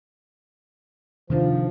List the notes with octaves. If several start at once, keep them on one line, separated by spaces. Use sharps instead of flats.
C3 D#3 F3 D4